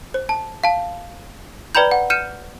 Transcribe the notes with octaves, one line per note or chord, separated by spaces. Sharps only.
C5
A5
F5 A5
B4 D5 G5 A#5 B5 G6
F#5
F6 G6 C#7 D#7 E7